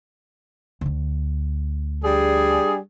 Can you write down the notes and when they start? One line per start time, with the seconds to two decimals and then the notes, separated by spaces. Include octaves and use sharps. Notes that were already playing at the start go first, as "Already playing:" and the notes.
0.81 D2 D3
2.03 G3 D4 G#4